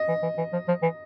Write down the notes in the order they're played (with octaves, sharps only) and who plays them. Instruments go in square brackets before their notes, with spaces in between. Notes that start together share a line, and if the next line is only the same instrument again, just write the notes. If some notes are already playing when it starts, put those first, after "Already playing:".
Already playing: [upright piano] D#5
[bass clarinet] E3
E3
E3
F3
F3
E3